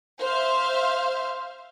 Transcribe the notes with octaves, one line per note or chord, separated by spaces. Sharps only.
C5 E5 F5 C6 F6